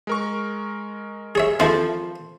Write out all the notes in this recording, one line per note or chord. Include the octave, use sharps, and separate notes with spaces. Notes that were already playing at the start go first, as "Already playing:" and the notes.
G#3 A#4 C#6
G#4 C#5 E5
F3 C4 E4 A4